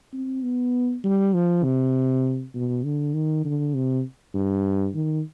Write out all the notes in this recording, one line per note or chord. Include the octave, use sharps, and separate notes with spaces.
C4
B3
G3
F3
C3
B2
D3
D#3
D3
C3
G2
D#3